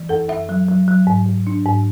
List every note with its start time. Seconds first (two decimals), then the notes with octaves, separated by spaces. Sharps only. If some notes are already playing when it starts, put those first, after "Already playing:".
Already playing: E3
0.09 F#2 A4
0.29 F#2 E5
0.49 F#3
0.68 F#3
0.88 F#3
1.07 G#2
1.26 G#2
1.47 D4
1.65 G#2